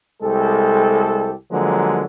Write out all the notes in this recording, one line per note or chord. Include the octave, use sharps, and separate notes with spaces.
C2 G#3 G4 A4
D3 F3 F#3 G#3 A#3